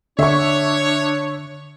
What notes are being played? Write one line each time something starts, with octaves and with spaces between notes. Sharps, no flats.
D3 D4 C#5 E5 C#6